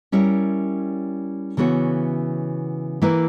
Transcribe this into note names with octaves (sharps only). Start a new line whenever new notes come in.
G3 C#4 E4 A#4 C#5
C#3 E3 B3 F#4 C#5
E3 A#3 E4 B4